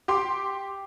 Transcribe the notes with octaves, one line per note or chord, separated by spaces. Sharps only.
G4 C6 D6